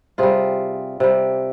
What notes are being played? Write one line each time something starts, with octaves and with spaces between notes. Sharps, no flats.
C3 G3 F4 G#4
C3 G3